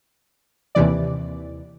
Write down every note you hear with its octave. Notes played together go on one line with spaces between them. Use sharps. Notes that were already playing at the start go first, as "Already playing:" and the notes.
D#2 C3 E3 D5